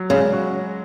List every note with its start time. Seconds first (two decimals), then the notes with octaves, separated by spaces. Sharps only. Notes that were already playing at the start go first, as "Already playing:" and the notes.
Already playing: F#3
0.10 C#3 G#3
0.33 F#4